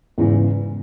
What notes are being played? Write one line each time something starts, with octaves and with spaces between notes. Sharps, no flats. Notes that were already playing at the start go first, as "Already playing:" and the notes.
E2 G#2 C#3 E3